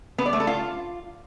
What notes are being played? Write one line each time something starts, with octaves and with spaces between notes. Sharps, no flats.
B3
D5
A3
A4
F4